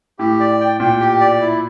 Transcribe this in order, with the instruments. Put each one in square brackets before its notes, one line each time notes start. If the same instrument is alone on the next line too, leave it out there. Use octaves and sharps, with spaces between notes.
[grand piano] A2 [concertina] G4
[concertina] D5
G5
[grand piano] A#2 [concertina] G5
[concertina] G4
D5
E4